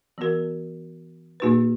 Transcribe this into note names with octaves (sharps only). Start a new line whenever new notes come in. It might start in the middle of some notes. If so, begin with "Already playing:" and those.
E3 B3 F#4 A#4
A#2 A#3 D#4 F#4 B4